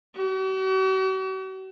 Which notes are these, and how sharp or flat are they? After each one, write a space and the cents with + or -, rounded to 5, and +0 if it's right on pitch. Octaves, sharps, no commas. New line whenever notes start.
F#4 +45